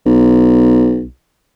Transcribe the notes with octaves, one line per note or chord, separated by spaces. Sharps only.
B1